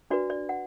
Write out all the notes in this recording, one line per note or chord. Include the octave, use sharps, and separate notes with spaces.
D4 F#4 B4 D5
D5
F#5